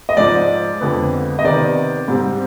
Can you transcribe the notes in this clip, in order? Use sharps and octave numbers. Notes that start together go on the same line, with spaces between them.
D#5
G#2 F3 G#3 D5
F2 D3 G#3 B3
D#5
C3 D#3 B3 D5
G#2 G3 C4